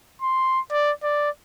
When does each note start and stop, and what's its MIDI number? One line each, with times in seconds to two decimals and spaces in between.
0.22 0.60 84
0.72 0.91 74
1.03 1.30 74